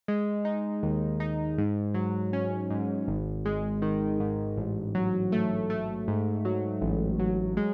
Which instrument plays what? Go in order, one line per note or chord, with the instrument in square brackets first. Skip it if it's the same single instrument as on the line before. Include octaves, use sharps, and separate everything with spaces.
[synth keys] G#3
D#4
D#2
D#4
G#2
F#3
C#4
G#2
G#1
G#3
D#3
G#2
A1
F#3
A3
A3
G#2
F#3
A1
F#3
G#3